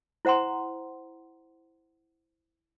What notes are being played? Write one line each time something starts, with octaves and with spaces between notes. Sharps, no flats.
E4 C5 F#5 A#5 C6